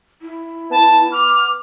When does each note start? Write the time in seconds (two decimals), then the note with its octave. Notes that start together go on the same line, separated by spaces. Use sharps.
0.22 E4
0.71 B3 A5
1.12 D6 F6